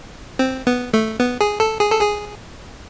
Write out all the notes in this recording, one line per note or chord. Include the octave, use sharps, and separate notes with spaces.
C4
B3
A3
B3
G#4
A4
G#4
A4
G#4